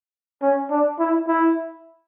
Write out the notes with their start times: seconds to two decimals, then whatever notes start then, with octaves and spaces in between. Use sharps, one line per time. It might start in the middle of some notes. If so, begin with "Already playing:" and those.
0.42 C#4
0.70 D4
1.00 E4
1.28 E4